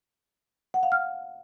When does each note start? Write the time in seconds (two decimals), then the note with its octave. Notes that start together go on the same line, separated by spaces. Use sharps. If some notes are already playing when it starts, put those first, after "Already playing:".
0.74 F#5
0.83 F5
0.92 F6